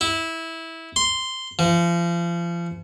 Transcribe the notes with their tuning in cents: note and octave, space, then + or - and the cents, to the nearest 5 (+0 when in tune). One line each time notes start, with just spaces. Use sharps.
E4 -15
C6 -5
F3 -35